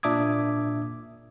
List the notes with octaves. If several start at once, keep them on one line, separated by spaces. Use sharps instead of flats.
A#2 D4 E5 D6 D#6 G#6